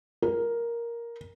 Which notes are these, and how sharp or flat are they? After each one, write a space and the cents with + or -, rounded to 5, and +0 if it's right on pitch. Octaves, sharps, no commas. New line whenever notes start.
A#4 +5